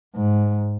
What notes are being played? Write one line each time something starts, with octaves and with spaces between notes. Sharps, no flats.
G#2